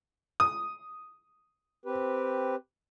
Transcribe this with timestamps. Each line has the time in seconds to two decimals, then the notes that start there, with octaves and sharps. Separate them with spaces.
0.40 D#6
1.86 C4 G4 B4